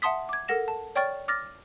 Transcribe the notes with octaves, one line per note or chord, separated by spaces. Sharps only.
E5 F#5 A5 C6 D#6 B6
D6 G#6
A4 A#4 F#5 A#6 E7
A5
C#5 D5 G5 C#6 F6 A6
D6 F6 A6 A#6